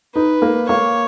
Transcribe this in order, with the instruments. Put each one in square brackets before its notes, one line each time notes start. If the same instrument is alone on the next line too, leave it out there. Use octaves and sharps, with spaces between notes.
[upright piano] D#4 [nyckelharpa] B4
[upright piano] A#3
[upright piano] A#3 [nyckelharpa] C#5